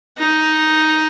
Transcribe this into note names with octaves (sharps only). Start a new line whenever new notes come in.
D#4